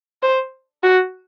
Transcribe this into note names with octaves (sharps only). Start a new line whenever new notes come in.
C5
F#4